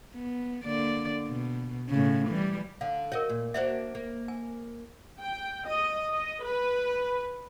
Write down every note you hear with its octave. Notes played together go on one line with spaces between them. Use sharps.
B3
D3 A#3 D5
B2
A2 C#3
E3 G3
D3 F5
F#4 A#4 C#5 D#5
A#2
A#3 D4 F#4 C5 E5
A#3
G#5
G5
D#5
D#5
B4